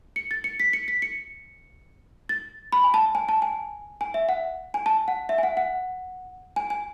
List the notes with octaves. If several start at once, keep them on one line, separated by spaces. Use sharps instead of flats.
C#7
A6
C#7
B6
C#7
B6
C#7
A6
B5
G#5
A5
G#5
A5
G#5
G#5
E5
F#5
G#5
A5
F#5
E5
G#5
F#5
F#5
G#5
G#5